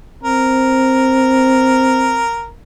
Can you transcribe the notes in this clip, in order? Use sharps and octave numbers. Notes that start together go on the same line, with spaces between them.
C4 A#4